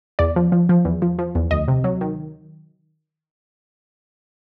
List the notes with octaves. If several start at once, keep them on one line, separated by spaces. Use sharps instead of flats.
E2 D5
F3
F3
F3
E2
F3
F3
E2
D2 D#5
C3
F#3
D#3